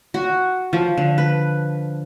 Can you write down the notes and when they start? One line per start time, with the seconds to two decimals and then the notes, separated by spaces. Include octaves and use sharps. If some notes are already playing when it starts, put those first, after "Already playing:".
0.14 F#4
0.73 F3
0.98 D3
1.18 B4